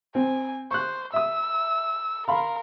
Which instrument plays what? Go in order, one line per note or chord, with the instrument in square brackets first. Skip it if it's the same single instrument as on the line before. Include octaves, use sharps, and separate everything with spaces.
[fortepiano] C4 [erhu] G#5
[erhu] C5 [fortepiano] C#6 F#6
[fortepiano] E5 D#6 [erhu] E6
[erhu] A#4 [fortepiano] F5 B5 C6